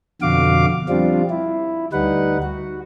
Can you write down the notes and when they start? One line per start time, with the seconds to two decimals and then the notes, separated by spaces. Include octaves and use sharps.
0.22 F2 B2 D3 F#4 F5 D6
0.89 F3 G3 C4 D4 F4
1.30 E4
1.92 D2 G3 D#4 B4 F#5
2.43 F#4